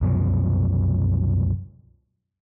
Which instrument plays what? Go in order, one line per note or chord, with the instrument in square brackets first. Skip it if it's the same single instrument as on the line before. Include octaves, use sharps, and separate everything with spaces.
[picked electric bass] C2 F#2 B2 F3